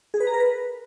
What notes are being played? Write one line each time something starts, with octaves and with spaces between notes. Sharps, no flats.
G#4
B4
A#5
A#4
B4